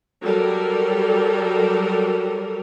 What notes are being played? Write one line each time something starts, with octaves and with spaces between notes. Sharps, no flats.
F#3 G3 A4 A#4